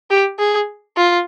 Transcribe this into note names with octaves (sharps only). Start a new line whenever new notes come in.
G4
G#4
F4